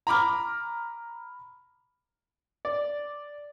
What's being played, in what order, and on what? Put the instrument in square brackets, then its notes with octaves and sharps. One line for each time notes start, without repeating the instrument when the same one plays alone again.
[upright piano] A#5 B5 D6 F6
[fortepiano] D5